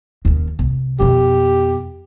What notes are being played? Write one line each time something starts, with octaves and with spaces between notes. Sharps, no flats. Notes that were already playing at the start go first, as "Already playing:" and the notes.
D#2 C#4
C2
F2 B2 G4